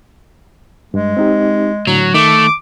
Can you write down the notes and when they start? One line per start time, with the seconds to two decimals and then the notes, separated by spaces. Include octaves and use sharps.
0.94 G2 G#3
1.17 C4 D#4 G4
1.87 A2 D3 F#3
2.14 D#3 A3 D6